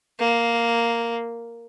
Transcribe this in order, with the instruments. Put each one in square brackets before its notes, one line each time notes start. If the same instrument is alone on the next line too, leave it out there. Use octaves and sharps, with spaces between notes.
[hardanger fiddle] A#3